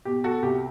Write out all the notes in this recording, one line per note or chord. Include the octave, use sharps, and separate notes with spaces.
B2 G4
F#4 A4
C2 G4